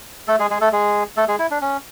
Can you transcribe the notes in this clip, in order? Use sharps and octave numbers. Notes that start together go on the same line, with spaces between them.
A3 A4
G#3 G#4
G#3 G#4
A3 A4
G#3 G#4
A3 A4
G#3 G#4
E4
D4
C#4